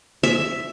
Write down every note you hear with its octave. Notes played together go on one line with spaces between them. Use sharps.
E5